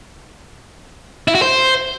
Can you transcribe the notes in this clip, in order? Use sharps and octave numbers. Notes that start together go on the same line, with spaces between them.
E4
F#4
C5